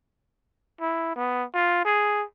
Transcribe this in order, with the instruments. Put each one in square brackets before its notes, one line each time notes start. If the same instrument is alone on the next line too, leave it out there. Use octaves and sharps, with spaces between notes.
[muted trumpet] E4
B3
F4
G#4